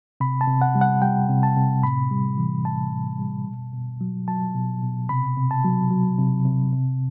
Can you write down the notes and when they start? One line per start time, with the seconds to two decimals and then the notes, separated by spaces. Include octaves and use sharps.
0.20 C3 B5
0.41 A5
0.48 C3
0.61 F#5
0.75 G3
0.81 F#5
1.02 G3 G5
1.29 C3
1.43 A5
1.56 C3
1.83 A2 B5
2.11 G3
2.38 E3
2.65 A2 A5
2.92 A2
3.19 G3
3.47 B2
3.74 B2
4.01 F#3
4.28 F#3 A5
4.55 B2
4.83 B2
5.09 C3 B5
5.37 C3
5.51 A5
5.64 F#3
5.91 F#3
6.18 C3
6.45 C3
6.72 C3